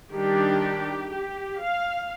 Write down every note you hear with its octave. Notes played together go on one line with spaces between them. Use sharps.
D#3 G3 D4 G4
G4
F5